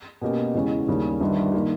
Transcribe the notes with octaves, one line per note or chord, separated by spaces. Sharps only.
B2 A#3 C#4 G4
E2 C#3 G#3 C#4
D#2 C#3 G3 C#4
G1 G2 D#3
D#3 A#3